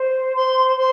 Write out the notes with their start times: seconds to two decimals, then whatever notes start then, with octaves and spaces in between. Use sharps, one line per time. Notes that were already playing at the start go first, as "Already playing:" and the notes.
Already playing: C5
0.33 C5 C6
0.75 C5 C6